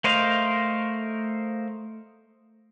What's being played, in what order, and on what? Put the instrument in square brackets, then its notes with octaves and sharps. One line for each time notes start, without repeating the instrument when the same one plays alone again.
[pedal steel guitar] A3 A#4 C5 D#5 F5